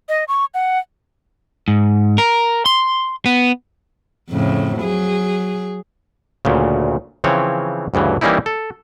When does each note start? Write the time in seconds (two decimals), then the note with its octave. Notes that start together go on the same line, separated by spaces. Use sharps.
0.09 D#5
0.28 C#6
0.54 F#5
1.68 G#2
2.18 A#4
2.66 C6
3.26 B3
4.30 F2 A2 C#3
4.78 F#3 G#4
6.45 D2 A#2 C#3
7.24 C#3 E3 F3 C4 C#5
7.94 D2 G2 C#3 E3
8.21 E3 G3 A#3 C#4 D#4 E4
8.46 A4